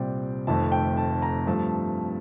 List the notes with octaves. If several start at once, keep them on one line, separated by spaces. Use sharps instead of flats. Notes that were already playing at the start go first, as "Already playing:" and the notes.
Already playing: C2 A#2 G3 C4 D5 G5
F1 F2 D#3 A3 A5
G5
A5
A#5
G2 F3 A3 A5